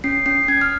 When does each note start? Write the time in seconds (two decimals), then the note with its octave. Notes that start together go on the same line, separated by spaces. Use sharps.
0.04 C#4 C7
0.26 C#4 C7
0.48 C#4 G#6
0.61 F6